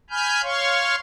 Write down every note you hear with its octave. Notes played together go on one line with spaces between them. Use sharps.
G#5 B5 F6 G6
C#5 F5 C6 C#6